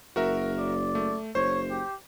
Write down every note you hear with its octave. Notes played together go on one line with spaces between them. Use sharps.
F#1 F#4 A#4 E5
D5
A3
F#1 C5 C#5
G4